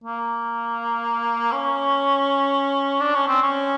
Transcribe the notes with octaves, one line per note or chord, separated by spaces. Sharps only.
A#3
C#4
D4
C#4
C4
C#4